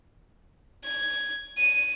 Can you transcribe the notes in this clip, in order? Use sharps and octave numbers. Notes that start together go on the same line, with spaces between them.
G#6
D#7